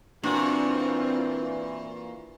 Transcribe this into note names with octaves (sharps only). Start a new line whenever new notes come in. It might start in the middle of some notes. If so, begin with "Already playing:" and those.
A#2 E3 C4 D4 F4 F#4